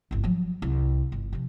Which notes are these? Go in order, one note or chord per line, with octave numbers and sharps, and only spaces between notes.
G1 C2
F3 F#3
C2
G1
C3 F3